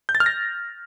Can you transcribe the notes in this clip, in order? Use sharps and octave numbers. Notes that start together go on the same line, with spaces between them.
G6
A6
F6
A#6